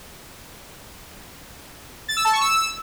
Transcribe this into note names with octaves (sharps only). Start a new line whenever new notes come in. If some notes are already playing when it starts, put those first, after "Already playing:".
A6
E6
A5
C#6
E6